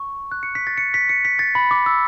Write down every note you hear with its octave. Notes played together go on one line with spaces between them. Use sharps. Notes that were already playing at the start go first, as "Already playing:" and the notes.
Already playing: C#6
F#6
C#7
B6
A6
C#7
B6
C#7
B6
A6
B5
D6
E6